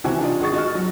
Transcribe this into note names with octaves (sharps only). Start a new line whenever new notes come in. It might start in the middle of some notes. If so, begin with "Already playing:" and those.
C#2 C3 E3 F#4 G4 G#5
D4 D#4 F4 D5
G#1 G#4 C#6 A6
F#4 D#5 C#6 F6
F#3